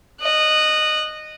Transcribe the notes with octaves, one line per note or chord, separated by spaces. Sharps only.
D#5 F#6